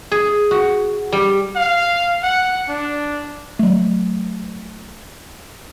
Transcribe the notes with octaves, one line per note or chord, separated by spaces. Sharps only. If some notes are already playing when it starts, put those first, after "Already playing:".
G#4
F#4
G3
F5
F#5
D4
F#3 A3